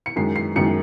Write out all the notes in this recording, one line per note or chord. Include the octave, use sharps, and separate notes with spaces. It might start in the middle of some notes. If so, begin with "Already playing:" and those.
C#7
F#2 D#3 G#3 C7
C7
F#2 D#3 G#3 C#7